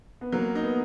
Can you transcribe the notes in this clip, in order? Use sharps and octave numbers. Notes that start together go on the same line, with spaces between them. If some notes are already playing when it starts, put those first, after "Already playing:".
B3
F#3 A#3
D#4
B3